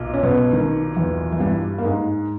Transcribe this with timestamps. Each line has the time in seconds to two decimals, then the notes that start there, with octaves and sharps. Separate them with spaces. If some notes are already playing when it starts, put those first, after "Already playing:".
Already playing: B1 A#2
0.14 C#4
0.23 B2 B3
0.53 D#3
0.96 E2 E3
1.32 E3
1.40 G2 G3
1.78 A#3
1.84 G#2 G#3